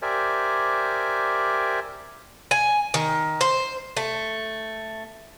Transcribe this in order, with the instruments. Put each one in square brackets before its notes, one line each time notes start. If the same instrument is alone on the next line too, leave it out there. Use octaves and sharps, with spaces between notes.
[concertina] G4 A#4 C5 D5 E5 G#5
[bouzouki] G#5
D#3
C5
A3